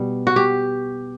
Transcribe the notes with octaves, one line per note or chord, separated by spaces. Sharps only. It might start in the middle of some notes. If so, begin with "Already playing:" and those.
Already playing: B2 G3
F#4
G4